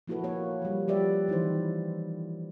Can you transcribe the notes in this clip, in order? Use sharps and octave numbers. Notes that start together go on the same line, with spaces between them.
F3 A#3 E4 F#4 A4 B4
A#3 C#5
F3 G3
F3 G3 G4 B4 D5 E5
D#3 E3 D#4 E4 C5